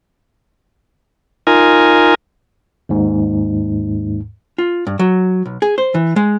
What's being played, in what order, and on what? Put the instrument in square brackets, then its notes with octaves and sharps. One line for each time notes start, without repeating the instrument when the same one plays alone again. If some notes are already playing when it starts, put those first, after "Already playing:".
[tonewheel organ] D#4 F4 A#4 G#5
[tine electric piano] D#2 G#2
[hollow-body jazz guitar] F4
G2
F#3
B1
G#4
C5
E3
G#3